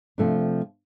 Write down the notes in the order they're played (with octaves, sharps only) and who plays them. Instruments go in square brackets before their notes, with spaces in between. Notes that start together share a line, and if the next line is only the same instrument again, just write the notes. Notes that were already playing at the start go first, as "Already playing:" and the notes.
[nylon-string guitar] C3 F3 A3 D4